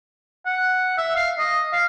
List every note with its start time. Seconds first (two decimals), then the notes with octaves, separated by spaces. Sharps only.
0.46 F#5
0.98 E5
1.16 F5
1.39 D#5
1.73 F5